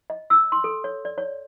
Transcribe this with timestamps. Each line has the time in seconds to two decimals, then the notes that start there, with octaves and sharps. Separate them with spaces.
0.10 D#5
0.30 E6
0.52 C6
0.64 A4
0.84 C#5
1.05 D5
1.18 C#5